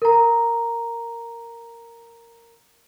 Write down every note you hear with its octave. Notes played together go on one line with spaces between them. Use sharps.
A#4 A#5